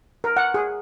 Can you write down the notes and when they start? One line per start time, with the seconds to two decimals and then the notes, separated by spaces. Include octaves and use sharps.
0.24 A#4
0.37 F#5
0.54 G#4